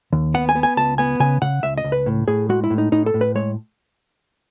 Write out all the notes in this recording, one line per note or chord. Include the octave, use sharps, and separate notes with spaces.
D#2
B3 F#5
G#5
B3
G#5
C#2 A5
B3 G#5
C#3 G#5
C#3 F#5
C#2 E5
D#5
C#2
B4
A2
A2 G#4
G#3 F#4
E4
A2
D#4
A2 D#4
A4
A2
B4
G#3 C#5